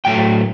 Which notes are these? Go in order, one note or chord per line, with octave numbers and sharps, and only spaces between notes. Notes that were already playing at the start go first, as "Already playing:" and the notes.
A2 F#3 A3 G5